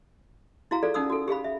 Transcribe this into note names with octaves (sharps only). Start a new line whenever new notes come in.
E4 F#4 F5 A#5
F4 G#4 A4 D5
C#4 D#4 F#5 D#6 E6
F#4 A4
G4 G#4 F5 B5
E5